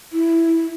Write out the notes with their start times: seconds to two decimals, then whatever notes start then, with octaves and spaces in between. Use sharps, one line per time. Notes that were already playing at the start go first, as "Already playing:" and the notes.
0.13 E4